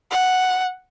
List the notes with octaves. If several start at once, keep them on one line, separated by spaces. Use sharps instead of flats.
F#5